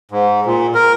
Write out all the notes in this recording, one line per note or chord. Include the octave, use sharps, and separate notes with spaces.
G#2
A#2
A#4